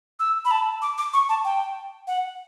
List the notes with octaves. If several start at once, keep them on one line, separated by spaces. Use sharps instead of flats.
E6
B5
A5
D6
D6
C#6
A5
G5
F#5